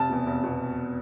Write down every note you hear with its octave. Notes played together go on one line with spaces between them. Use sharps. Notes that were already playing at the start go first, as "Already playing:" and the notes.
Already playing: F1 A5
E2 B2
F1
B2